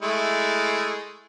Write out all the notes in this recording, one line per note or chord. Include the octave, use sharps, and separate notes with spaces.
G#3 A3 E4